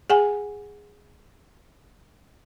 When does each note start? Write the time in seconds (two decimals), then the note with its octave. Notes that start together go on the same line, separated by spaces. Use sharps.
0.10 G#4 F#5 G#5